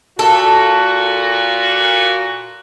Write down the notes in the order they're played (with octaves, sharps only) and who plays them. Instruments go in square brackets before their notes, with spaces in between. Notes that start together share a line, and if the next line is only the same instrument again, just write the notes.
[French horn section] A#2 F#4 [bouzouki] A4